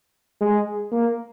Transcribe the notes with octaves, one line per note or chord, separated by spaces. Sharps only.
G#3
A#3